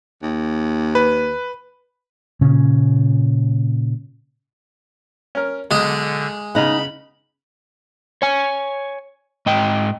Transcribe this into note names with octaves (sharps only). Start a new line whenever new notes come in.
D#2
B4
A#2 C#3 C#4
C#4 A#4
B1 D3 G#3 G#4
C#3 B3 D#4 F#5 B5
C#5 G#5
G#2 D#5 G5